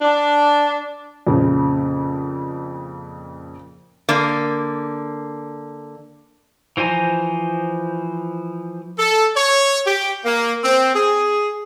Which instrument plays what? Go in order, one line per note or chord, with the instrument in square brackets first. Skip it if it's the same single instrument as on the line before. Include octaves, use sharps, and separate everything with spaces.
[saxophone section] D4
[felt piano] F2 A#2 C#3
[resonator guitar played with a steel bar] D3 A#3
[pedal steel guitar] E3 F3 C5 G#5 A#5
[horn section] A4
C#5
G4
A#3
C4
G#4